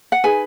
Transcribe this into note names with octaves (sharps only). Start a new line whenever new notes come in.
F#5
D#4 G#4 B4 G#5